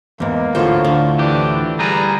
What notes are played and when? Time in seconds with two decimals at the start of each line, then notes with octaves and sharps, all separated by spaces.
0.20 E2 G#2 A#3
0.55 D2 A2 F4 A4 C5
0.84 D3
1.18 E3 D4 G4
1.79 G3 G#4 B4 A#5